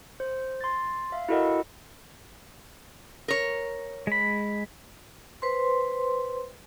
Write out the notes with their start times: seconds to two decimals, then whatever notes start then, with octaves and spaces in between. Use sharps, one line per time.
0.20 C5
0.61 C6 A6
1.12 E5 F5
1.29 E4 F#4 A4 A#4 D#5 F#5
3.28 A#4 C#5
4.07 G#3 B5
5.42 B4 C5 C6